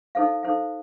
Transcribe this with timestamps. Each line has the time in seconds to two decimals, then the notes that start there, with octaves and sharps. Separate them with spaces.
0.15 D#4 A4 C5 F5
0.43 D#4 A4 C5 F5